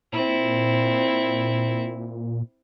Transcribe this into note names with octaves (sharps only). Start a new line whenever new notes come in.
A#2 C4 E4